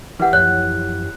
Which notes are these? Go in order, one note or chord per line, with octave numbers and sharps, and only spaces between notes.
E3 E4 G4 B4 F#5
F#2 F3 C#5 F#6